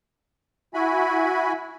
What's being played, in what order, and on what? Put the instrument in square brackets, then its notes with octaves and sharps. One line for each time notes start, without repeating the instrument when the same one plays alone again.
[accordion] E4 F#4 G#5 B5